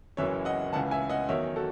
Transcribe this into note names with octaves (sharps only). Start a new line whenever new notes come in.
F#1 F#2 E3 C#5 E5
D#5 F#5
C#2 C#3 E3 F#5 A5
E5 G#5
D#5 F#5
E2 D#3 F#3 C#5 E5
F#4 A4